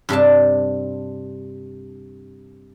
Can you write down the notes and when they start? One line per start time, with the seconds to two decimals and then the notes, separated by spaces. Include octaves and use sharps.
0.09 G2 C3 D4 A5